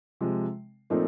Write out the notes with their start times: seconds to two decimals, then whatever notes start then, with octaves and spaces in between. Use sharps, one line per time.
0.21 C3 F3 G#3
0.90 A#2 F3 A3 C4 D#4